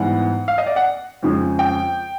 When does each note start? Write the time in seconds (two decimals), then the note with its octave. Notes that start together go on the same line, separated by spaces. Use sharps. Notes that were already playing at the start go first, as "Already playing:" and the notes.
Already playing: G#2 E3 G3 B3 F#5
0.48 F5
0.58 D#5
0.66 D5
0.76 F#5
1.23 F2 C#3 F3 G#3
1.59 G5